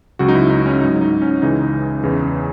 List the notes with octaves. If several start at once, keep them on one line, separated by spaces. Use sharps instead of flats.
C#2 C#3 F#3 F#4
D#4
E4
D#4
C#4
G#2 F#3 D#4
D#4
C#4
C#2 C#3 E3 D#4
E2 C#3 E3